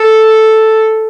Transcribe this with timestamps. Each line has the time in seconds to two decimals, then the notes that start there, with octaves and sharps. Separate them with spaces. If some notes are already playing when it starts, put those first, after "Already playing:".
Already playing: A4